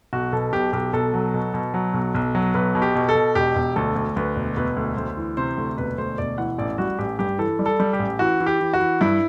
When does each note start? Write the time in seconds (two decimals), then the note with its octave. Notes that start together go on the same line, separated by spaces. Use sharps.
0.13 B1 F#4
0.33 B2 A4
0.53 B1 G4
0.73 B1 G4
0.93 B1 A4
1.14 F#3
1.34 B2
1.54 B2
1.74 F#3
1.94 B1
2.15 B1
2.35 F#3
2.55 B1 B4
2.75 B2
2.82 G4
2.95 B2
3.09 A4
3.15 B2
3.35 E1 G4
3.56 E1
3.76 D2 A4
3.96 D2
4.16 D2 B4
4.36 E1
4.57 E1 B4
4.76 D2
4.97 D2 C5
5.17 E3
5.37 C3 C5
5.57 D2
5.78 E1 B4
5.98 D2 C5
6.18 E1 D5
6.38 E3 F#5
6.58 A1 D5
6.78 G3 F#4
6.99 A1 G4
7.19 G2 G4
7.39 E3 A4
7.59 G3
7.66 A4
7.80 G3
7.93 G4
7.99 A1
8.19 E3 F#4
8.40 E3
8.46 G4
8.60 E3
8.73 F#4
8.80 E3
9.01 G2 E4